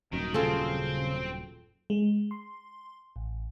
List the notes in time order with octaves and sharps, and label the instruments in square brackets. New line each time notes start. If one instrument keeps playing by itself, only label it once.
[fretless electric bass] D#1 F#2 [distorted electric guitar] D#3
[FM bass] C#3 [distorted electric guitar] C4 C5 [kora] F4 G#4 A4
[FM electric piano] G#3
C6
A1